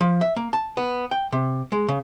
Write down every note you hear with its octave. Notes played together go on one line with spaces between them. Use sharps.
F3
E5
A#3
A5
B3
G5
C3
G#3
C#3